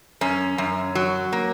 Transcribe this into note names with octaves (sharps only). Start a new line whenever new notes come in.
F#2 C#4
F#2
F#3
A#3